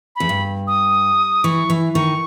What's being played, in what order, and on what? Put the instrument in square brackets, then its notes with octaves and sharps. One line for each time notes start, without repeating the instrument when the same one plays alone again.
[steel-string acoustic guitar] E2 [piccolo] B5
[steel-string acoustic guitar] G2
[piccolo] D#6
[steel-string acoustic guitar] E3 [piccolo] C#6
[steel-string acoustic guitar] E3
[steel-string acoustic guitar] D#3 [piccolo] C#6